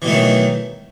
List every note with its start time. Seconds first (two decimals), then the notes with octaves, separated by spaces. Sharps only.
0.02 E3
0.05 B2
0.07 A3
0.10 D#3
0.13 F#3